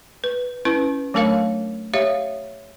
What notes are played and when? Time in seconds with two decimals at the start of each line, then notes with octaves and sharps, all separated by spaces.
0.24 B4
0.65 C#4 E4 B4
1.14 F#3 A3 D4 A#4 C#5 F5
1.94 G4 C#5 E5 F5